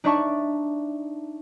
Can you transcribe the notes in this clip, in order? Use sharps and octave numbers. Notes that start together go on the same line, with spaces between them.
D4 D#4 D5 E5 A5 C#6